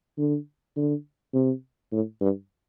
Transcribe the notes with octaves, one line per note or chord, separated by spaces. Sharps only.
D3
D3
C3
A2
G2